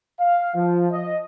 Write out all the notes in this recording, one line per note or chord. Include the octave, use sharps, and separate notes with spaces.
F5
F3
D#5